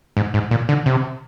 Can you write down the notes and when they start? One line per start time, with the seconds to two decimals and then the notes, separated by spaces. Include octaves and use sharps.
0.17 G#2
0.34 G#2
0.51 A#2
0.69 D3
0.86 C3